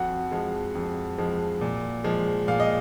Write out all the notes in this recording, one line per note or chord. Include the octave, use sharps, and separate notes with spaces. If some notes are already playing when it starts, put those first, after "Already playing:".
Already playing: F2 F#4 F#5
F3 G#3
F2
F3 G#3
A#2
F3 G#3
A#2 F5
D#5